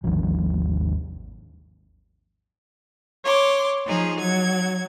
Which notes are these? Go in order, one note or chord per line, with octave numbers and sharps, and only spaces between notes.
G#1 D#2 D#3 F3
C#5 C6 D6
F3 D#4 G#4
F#3 G#6